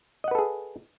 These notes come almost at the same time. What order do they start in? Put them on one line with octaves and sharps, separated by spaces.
D#5 F#5 B4 A4 G#4